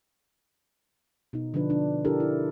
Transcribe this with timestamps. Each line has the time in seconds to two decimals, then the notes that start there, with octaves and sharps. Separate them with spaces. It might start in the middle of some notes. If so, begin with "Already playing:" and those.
1.33 B2 D#4
1.54 D3 F3 D4 B4
1.70 D4
2.05 D4 E4 G4 A4 A#4
2.20 E4